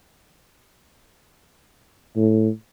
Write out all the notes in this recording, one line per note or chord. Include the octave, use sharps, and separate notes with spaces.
A2